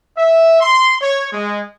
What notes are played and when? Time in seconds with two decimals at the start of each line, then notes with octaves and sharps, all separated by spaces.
0.17 E5
0.61 C6
1.01 C#5
1.32 G#3